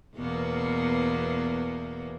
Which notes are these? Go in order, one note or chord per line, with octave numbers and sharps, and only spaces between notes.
E2 B2 A#3